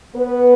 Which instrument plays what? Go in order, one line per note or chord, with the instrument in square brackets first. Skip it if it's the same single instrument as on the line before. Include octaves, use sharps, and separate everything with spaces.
[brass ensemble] B3 B4